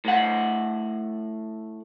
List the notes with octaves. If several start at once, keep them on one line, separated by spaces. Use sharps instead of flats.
A2 F#5